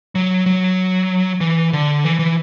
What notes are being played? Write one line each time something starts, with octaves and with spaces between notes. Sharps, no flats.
F#3
F#3
E3
D3
E3
E3